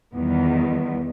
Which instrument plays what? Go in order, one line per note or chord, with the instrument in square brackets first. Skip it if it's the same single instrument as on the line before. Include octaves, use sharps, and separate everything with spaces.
[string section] E2 D#3 G3 [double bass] B3